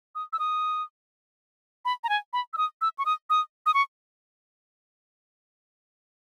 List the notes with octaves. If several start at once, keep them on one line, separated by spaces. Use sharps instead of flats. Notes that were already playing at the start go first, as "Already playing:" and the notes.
D#6
E6
D#6
B5
A#5
G#5
B5
E6
D#6
E6
C#6
D#6
D#6
D#6
C#6